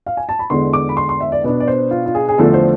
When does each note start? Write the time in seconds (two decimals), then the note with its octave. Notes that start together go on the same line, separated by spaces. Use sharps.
0.06 F5
0.17 G#5
0.29 A5
0.39 B5
0.50 E2 D3 G#3 C6
0.73 D6
0.89 B5
0.97 C6
1.09 C6
1.20 E5
1.32 D5
1.44 B2 B3 D4 D5
1.60 D5
1.68 C5
1.91 F4
2.06 F4
2.15 G#4
2.29 G#4
2.38 E2 D3 F3 A3 A4
2.54 C5